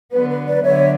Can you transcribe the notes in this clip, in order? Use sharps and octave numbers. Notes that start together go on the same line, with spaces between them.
D3 F#3 B3 B4
B4
B4 D5
D3 F#3 B3 C#5 E5